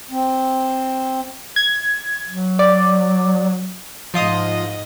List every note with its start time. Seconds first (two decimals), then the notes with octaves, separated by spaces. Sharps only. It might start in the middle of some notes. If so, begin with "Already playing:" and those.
0.11 C4
1.56 G#6
2.28 F#3
2.59 D5
4.14 G#2 F3 F4 D#5 D#6